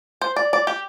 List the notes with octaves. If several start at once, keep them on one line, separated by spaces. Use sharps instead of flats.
C5
D5
D5
G4